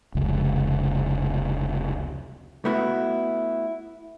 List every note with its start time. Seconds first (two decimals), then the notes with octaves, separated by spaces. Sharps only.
0.15 F1 C#2
2.65 A3 B3 E4 F#4